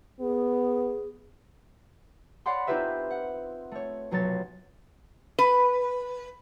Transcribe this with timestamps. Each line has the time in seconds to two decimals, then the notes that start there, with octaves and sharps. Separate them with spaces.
0.20 B3 G#4
2.46 C#5 D5 F5 F#5 B5 C6
2.67 C4 D#4 F4 G4 B4 E5
3.11 F#5
3.71 A3 C#5
4.11 F1 B1 F#3 C#5 A6
5.39 B4